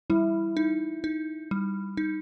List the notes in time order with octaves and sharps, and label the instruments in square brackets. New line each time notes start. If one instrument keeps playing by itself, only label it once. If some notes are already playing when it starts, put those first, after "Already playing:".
[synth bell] G3 [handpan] E4
[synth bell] D#4
D#4
G3
D#4